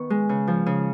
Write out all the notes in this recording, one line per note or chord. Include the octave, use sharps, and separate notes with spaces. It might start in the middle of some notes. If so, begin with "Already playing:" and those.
Already playing: D#3 B3 C#6
G#3
C#3
F3
C#3